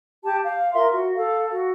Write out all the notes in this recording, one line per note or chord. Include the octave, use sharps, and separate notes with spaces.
G4 A5
F5
F4 A#4 E5 C6
F#4
A4 F5
F#4